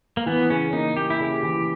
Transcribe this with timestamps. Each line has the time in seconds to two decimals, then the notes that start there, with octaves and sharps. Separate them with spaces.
0.17 A#3
0.26 E3 B3
0.50 C#3 C#4
0.73 A#3 D#4
0.96 A#3 G4
1.10 E4
1.20 C#3 G4
1.43 E3